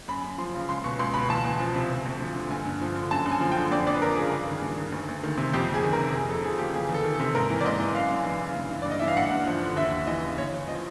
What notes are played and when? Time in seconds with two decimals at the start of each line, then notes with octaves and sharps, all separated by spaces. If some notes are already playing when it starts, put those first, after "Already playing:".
0.08 F#2 B5
0.24 F#2
0.38 F3 C6
0.54 C#3
0.69 C#2 C6
0.84 B2 C#6
0.99 C#2 C6
1.14 B2 B5
1.29 E2 A5
1.44 E2
1.60 F3
1.75 C3
1.90 D2
2.05 D2
2.20 F3
2.35 D3
2.51 G2 G#5
2.65 G2
2.81 F3
2.96 D3
3.11 F#2 A5
3.26 F#2
3.31 G#5
3.41 F3
3.52 G5
3.56 D3
3.71 F2 D5
3.87 F2 D5
3.94 B4
4.01 F3 A#4
4.16 C#3 G#4
4.31 G2
4.48 D#3
4.62 G2
4.78 D#3
4.92 D2
5.08 D2
5.23 D#3
5.37 C3
5.53 F2 G4
5.68 F2
5.74 G#4
5.84 D#3
5.93 A#4
5.98 C3
6.14 F2
6.29 F2 A4
6.44 F3 G#4
6.59 C#3 G4
6.74 E2 G#4
6.89 E2
6.94 A4
7.04 D#3
7.14 A4
7.19 C3
7.35 G#2 A#4
7.50 E3
7.61 D5
7.64 G#2 D#5
7.80 E3
7.95 F#2 F5
8.11 F#2
8.25 E3
8.41 C#3
8.55 G2
8.71 E3
8.82 D5
8.86 G2
8.91 D#5
9.00 E3 E5
9.08 F5
9.16 G2 F#5
9.31 G2
9.47 F3
9.62 D3
9.76 D#2 E5
9.92 D#2
10.07 E3 D#5
10.23 C#3
10.38 E2 C#5
10.53 E2
10.67 F3 D#5